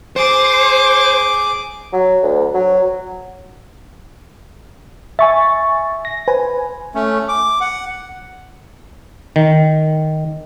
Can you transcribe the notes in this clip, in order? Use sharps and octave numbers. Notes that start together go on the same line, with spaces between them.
G#4 C5 D6
F#3
D2
F#3
E5 G#5 C#6 A6
A#6
B4 C5 G#5
A3 C#4
D6
F#5
D#3